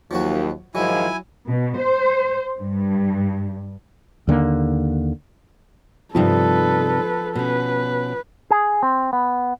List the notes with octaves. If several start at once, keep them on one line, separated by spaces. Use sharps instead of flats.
D#2 F3 F#3 F#4
G#2 D#3 F3 F#3 E4 G#5
B2
C5
G2
D#2 D3 G#3 A#3
G2 C3 F3 D#4 A4 B4
B2 C#4 B4
G#4
C4
B3